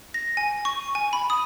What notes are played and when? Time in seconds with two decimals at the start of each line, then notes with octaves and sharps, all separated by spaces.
0.14 A#6
0.37 G#5
0.65 C#6
0.95 G#5
1.13 B5
1.30 D#6